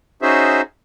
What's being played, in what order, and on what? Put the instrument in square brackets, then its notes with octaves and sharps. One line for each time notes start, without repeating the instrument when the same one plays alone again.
[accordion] C#4 D#4 F#4 G#4 C5 E5